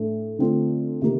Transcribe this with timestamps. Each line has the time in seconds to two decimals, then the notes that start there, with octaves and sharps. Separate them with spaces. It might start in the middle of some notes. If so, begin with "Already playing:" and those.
Already playing: A2 A3 D4
0.39 D3 A3 C4 F4
1.02 C3 D#3 A#3